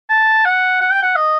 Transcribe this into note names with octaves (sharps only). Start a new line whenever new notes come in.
A5
F#5
F#5
G5
F#5
D#5